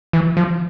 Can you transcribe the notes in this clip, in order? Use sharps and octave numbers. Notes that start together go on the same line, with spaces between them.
E3
F3